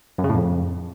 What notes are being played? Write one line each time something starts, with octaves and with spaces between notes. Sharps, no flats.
F#2
C#3
A2
F2